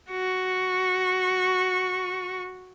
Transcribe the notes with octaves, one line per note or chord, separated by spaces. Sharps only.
F#4 C#6